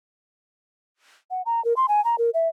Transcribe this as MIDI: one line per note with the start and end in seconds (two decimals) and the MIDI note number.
1.31 1.42 78
1.46 1.63 82
1.65 1.74 70
1.77 1.86 84
1.88 2.03 80
2.05 2.16 82
2.18 2.30 70
2.34 2.48 76